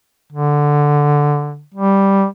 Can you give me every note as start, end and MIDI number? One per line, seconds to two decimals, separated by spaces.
0.33 1.62 50
1.75 2.26 55